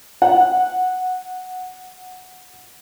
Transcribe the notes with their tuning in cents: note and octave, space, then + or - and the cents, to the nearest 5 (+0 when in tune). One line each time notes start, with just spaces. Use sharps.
F#5 -10